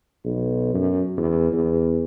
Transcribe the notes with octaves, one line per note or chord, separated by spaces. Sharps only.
B1
F#2
E2
E2